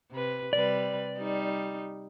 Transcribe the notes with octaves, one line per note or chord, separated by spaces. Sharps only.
C3 B4
C3 G3 B4 D5
G3 D#4